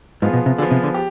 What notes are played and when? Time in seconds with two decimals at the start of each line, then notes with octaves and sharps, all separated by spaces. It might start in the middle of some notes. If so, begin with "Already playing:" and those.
0.22 G#2 F3 B3 F4 G#4
0.34 B2
0.46 C3
0.58 D3 F3 B3 F4 G#4
0.71 C3
0.83 D3
0.94 G4